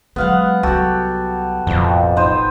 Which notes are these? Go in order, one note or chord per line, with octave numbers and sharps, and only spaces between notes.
F#3 G#3 B3 F5 F#5
C2 F#3 F#4 G4 A4
E1 A1 F2
D#4 B4 C5